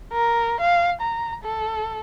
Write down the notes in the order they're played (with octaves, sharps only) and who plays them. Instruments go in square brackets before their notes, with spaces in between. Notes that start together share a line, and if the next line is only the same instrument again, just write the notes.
[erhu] A#4
F5
A#5
A4